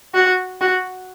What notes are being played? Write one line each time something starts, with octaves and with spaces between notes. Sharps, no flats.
F#4
F#4